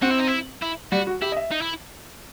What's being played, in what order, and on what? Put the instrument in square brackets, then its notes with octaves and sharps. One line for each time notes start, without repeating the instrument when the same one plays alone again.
[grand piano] C4 [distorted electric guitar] F#4
[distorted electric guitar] E4
D#4
E4
E4
[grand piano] G3 [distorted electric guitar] F#4
[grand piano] F#4
[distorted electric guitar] E4 [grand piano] G4
[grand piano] D#5
E5
[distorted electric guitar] D#4
E4